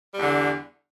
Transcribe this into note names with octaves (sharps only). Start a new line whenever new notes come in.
E2 D3 G3